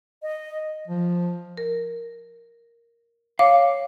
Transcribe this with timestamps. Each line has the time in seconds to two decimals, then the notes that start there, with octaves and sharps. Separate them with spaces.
0.23 D#5
0.88 F3
1.57 A#4
3.39 C#5 F5 D6